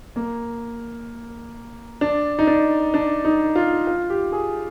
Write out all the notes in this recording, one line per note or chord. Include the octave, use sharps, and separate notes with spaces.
A#3
D4
D#4
D4
D4
D#4
F4
F4
G4
G#4